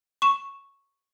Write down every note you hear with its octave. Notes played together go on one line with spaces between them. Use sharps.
C#6 E7